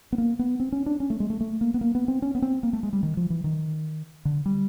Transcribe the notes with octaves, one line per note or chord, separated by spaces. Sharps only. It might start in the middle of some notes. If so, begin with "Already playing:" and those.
B3
A#3
B3
C4
C#4
D4
C#4
A3
G#3
A3
A3
A#3
B3
A#3
B3
C4
C#4
B3
C4
A#3
A3
G#3
G3
D#3
F3
E3
D#3
D3
G3